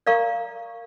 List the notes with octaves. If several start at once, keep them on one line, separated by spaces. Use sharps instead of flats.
A#4 D5 F5 A#5 C#6